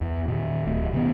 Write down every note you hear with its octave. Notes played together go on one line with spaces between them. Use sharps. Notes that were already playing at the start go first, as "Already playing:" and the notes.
E2
A#2 D#3
D1 A3
B2 D#3 E3 B3